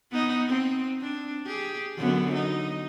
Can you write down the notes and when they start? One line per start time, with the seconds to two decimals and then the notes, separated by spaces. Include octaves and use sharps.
0.11 B3 D#4
0.48 C4
1.02 D4
1.46 G4 G#4
1.97 F#2 D3 B3
2.35 D#4